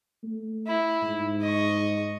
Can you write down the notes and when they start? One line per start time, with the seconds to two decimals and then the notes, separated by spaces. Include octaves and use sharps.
0.24 A3
0.67 E4
1.02 G#2
1.42 D#5 C#6